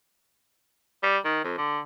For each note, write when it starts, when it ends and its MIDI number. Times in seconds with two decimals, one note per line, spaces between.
1.03 1.18 55
1.25 1.40 51
1.44 1.56 41
1.58 1.80 50